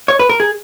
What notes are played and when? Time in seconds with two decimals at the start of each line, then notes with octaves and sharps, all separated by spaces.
0.08 C#5
0.19 B4
0.29 A#4
0.40 G#4